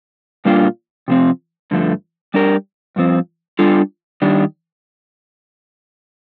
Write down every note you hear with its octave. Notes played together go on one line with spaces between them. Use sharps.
A#2 G3 A#3 D4 F4
C3 F3 C4
G2 D3 F3 A3
G3 D4 G4 A#4
G2 F3 C4
G3 D4 F4 A4
D#3 G3 D4